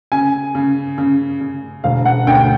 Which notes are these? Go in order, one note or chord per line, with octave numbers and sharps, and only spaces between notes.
C#3 G#5
C#3
C#3
C#3
E1 F5
F#5
D2 G5